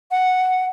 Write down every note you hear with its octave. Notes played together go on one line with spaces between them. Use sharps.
F#5